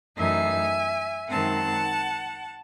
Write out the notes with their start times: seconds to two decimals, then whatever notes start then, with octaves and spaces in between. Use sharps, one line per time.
0.17 F#2 E3 A3 D#4 E5 G#5
1.29 F#2 D#3 G#3 C4 F#5 A5